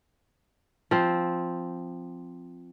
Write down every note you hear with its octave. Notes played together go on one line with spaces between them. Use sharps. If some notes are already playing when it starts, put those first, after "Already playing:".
F3 C4